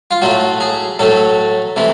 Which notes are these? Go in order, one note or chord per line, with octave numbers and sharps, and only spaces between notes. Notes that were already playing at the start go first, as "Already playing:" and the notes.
F4
A2 F#3 A3 F#4
G#4
A2 F#3 A3 A4
C3 E3 A3